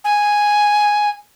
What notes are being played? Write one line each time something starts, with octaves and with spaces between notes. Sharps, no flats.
G#5